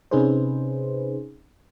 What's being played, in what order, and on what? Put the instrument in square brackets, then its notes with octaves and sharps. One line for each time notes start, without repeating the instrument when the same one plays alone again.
[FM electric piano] C3 C#4 D#4 G#4 B4 C5